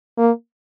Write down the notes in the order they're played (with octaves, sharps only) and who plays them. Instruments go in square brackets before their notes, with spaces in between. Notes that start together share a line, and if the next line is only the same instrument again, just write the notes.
[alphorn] A#3